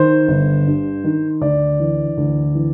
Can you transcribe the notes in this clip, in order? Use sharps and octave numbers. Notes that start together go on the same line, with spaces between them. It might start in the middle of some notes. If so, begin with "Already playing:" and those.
Already playing: D#3 C5
G1
G2
D#3
D2 D5
E3
D2
E3